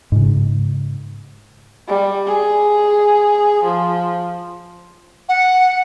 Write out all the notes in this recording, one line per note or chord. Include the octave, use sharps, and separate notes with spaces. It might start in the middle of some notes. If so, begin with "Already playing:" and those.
G#2 C#3
G3
G#4
F3
F#5